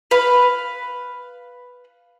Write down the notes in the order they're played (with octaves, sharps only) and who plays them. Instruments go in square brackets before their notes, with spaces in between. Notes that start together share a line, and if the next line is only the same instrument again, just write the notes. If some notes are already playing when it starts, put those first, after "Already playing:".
[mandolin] B4 F5 B5